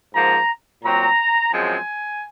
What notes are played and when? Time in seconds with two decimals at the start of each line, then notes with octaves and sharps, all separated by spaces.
0.13 G#2 F3 A#3 A#5
0.82 A#2 F#3 C4 A#5
1.52 F#2 F3 G#3 C4 G#5